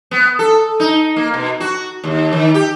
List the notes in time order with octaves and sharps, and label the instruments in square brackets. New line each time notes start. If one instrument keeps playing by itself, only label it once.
[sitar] B3
A4
D#4
A#3
B2
F#4
D#2
D#3
G4